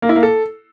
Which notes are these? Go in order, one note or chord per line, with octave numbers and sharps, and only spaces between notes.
A#3
E4
A#3
A4